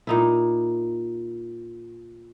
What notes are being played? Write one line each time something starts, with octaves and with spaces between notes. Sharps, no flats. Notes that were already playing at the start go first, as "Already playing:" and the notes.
A#2 D#4 E4